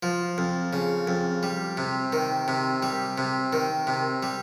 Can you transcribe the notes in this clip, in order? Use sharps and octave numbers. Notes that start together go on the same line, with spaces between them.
F3
F2
C#3
F2
G3
C3
D#3
C3
G3
C3
D#3
C3
G3